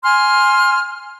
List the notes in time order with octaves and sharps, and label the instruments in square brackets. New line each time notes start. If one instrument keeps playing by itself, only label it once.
[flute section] G#5 C6 F6